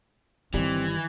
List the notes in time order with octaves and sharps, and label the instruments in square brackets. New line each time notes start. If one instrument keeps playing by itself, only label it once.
[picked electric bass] G1 G3 [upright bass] D#3 [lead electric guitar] E3 [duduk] C4